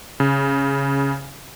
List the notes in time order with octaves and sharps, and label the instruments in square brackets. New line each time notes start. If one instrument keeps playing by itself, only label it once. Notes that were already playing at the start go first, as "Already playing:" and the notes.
[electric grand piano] C#3